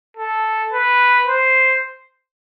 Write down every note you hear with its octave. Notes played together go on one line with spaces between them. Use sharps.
A4
B4
C5